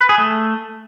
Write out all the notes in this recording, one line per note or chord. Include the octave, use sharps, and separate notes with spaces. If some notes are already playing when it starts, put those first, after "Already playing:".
B4
G#4
A3